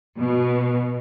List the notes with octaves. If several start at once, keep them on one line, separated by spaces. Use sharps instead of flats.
B2